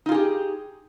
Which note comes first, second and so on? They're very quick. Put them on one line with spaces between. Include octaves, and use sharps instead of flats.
D#4 F4 G#4 G4